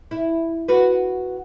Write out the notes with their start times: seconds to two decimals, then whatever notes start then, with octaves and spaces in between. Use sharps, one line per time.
0.11 E4
0.68 F#4 B4